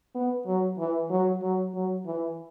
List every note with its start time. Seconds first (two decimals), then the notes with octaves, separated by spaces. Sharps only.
0.15 B3
0.46 F#3
0.79 E3
1.10 F#3
1.42 F#3
1.75 F#3
2.06 E3